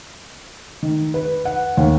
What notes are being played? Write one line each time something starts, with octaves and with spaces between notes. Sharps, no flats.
D#3
B4
F#5
D#2